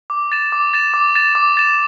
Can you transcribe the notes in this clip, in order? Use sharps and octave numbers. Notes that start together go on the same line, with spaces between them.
D6
A6 E7
D6
A6 E7
D6
A6 E7
D6
A6 E7